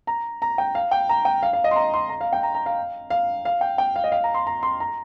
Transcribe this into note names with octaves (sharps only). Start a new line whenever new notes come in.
A#5
A#5
G5
F5
G5
A#5
G5
F5
F5
D#5
C6
A#5
C6
A#5
F5
G5
A#5
A#5
F5
F5
F5
G5
G5
F5
D#5
F5
A#5
C6
A#5
C6
A#5